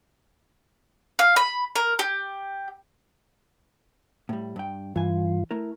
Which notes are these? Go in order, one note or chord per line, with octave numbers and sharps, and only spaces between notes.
F5
B5
A#4
G4
A2 G3
G2 G5
G2 E3 F4 G#5
A3 E4 A#4